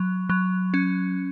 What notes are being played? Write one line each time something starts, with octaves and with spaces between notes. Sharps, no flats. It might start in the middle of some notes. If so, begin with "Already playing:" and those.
Already playing: F#3
F#3
C#4